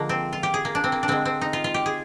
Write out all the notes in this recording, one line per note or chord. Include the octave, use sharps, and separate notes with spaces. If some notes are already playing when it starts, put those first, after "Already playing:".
Already playing: D3 F3 G#3 A#3
C4
F4
G4
G#4
A#3
D4
C4
A#3
D4
D3 G#3 C4
C4
D#4
F4
F4
G4
G#4